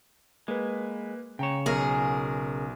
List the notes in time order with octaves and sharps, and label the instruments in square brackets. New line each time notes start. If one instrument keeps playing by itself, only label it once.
[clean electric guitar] G#3 [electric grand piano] A#3 B4
[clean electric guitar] C#3 C#5 [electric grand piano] G5 A#5 E7
[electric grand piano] B1 [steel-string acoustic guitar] G#4 A#4